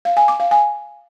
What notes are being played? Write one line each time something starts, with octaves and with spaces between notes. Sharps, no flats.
F5
G#5
D6
F5
G#5